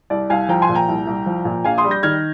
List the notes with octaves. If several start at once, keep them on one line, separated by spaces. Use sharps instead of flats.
C2 D5
C2 F5 G#5
F3 G5 A#5
G#5 C6
A#2
G5 A#5
C2
C2
F3
A#2
A#1 F5 G#5
C6 D#6
G3
G6 A#6
D#3 F6 G#6